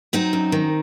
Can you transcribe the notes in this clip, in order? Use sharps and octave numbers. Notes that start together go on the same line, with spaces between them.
F#3 C4 D#4
F#2
D#3